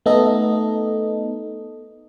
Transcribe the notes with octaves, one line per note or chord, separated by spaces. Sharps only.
A3 B3 D#4 A4 D#5